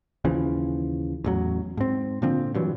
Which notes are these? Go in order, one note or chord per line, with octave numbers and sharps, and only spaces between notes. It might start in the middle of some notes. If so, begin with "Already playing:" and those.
D#2 C#3 E3 F3
A1 E2 F#3
G#2 C4
A#2 D3 F3 C4
G2 A#2 E3 F#3